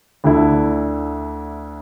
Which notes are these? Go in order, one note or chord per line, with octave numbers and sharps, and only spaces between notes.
D2 D3 A3 E4